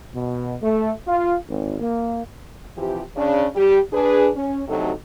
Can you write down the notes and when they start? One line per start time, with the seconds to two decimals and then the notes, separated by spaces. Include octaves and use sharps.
0.14 B2
0.61 A3
1.07 F4
1.47 G#1
1.80 A#3
2.77 C3 E3 F3 G4
3.16 C#3 D4
3.55 G3 G4
3.93 D4 G#4 B4
4.36 C#4
4.68 D2 C3 F#3 D#4 A4